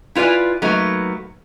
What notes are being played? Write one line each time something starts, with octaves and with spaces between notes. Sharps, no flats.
E4 F4 B4 D5 G#5
F#3 A3 A#3 D#4 B4